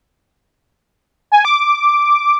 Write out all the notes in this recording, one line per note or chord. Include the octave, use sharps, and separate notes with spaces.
G#5
D6